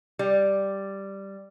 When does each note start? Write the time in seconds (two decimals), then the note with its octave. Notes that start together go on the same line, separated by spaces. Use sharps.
0.19 G3